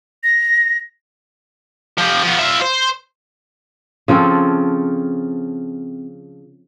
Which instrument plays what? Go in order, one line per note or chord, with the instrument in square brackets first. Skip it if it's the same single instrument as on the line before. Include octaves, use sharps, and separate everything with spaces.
[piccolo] A#6
[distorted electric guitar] F3 G4
F3 B3
F4 E5
C5
[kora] C#3 F3 C4 A4